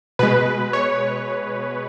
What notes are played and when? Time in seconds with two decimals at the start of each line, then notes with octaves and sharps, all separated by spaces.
0.19 B2 G#3 B4
0.73 C#5